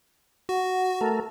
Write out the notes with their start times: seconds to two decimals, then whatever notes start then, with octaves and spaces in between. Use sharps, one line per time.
0.49 F#4 F#5
1.01 A3 A4 A#4